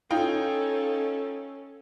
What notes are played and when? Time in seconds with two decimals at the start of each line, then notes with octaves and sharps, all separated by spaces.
0.11 C#4 D#4 F4 A4 G5